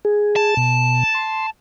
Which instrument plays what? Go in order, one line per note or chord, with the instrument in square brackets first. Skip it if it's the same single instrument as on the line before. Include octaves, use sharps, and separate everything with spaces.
[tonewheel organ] G#4
[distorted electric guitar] A5
[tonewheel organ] B2
C6